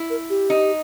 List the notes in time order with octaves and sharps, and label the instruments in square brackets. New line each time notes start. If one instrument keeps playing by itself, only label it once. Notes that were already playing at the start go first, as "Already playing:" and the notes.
Already playing: [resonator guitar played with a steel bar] E4
[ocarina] A#4
G4
[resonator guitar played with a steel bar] D#4